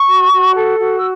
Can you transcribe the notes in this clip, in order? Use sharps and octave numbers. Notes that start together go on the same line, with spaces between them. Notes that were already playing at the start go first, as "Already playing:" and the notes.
Already playing: C#6
F#4
F#4
A4
F#4
E6